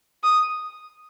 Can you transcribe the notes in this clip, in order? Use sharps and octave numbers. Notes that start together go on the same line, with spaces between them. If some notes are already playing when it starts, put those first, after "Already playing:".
D#6